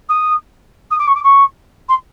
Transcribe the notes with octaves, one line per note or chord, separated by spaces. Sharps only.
D#6
D#6
D6
C#6
D6
C#6
C6